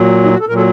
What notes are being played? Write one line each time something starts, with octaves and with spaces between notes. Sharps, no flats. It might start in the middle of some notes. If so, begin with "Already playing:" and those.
Already playing: A#2 F#3
D#4
F#4
A4
A#2 F#3 A4 A#4